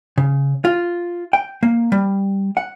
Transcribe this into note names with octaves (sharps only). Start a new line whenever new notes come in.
C#3
F4
G5
A#3
G3
F#5